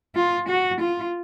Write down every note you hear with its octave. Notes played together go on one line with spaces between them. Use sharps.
F4
F#4
F4